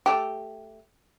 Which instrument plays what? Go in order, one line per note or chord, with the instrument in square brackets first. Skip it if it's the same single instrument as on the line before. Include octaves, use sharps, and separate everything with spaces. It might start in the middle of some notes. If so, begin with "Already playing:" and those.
[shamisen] A3 G4